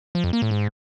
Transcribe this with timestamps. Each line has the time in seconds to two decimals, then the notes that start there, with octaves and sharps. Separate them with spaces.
0.15 F3
0.24 F2
0.33 A#3
0.42 A2
0.51 G#2